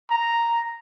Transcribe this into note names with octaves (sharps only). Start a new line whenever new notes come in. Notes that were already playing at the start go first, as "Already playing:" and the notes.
A#5